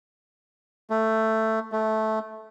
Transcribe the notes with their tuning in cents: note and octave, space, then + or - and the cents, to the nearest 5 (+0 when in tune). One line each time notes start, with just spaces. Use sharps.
A3 +10
A3 -10